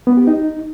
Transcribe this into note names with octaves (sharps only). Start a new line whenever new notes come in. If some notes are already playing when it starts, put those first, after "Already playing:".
B3
G4
D#4